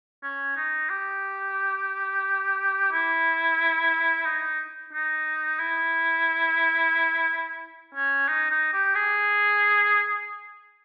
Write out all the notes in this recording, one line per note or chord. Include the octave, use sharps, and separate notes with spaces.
C#4
D#4
G4
E4
D#4
D#4
E4
C#4
D#4
D#4
G4
G#4